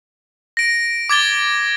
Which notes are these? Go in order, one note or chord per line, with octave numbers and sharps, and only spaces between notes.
A#6 D7
D6 G#6 A6 G7